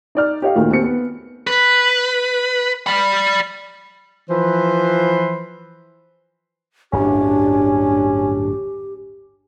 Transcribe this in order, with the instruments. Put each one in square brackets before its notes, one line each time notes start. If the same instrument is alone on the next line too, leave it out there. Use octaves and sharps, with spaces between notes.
[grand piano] D#4 D5 F6
G4 C#5 D#5 F5
D2 A#2 D#3
D#2 C4 C#7
B3
[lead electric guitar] B4
D5 B5
[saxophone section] E3 F3 B4 C5
[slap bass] D1 G1 [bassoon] C#4 [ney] D4 [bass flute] G4